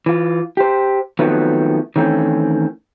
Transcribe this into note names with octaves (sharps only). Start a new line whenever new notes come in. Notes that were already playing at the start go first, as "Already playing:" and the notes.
E3 F4
G4 C5
D#3 F3 F#3 A3 B3 C4
D#3 E3 A3 C4 C#4